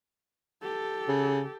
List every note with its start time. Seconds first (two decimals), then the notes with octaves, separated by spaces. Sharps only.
0.63 G4 A4
1.08 C#3